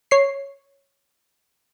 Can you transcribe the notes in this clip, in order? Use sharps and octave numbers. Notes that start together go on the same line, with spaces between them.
C#5 C7